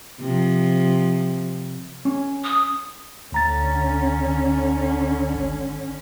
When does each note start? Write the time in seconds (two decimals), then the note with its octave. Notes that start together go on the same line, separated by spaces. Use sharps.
0.20 C3 F3
2.05 C#4
2.44 D#6
3.32 D2 D3 C#4 A#5 A6
5.35 G#1